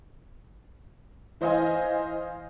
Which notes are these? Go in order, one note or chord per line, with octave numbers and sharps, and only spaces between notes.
E3 C5 D#5 F5 G#5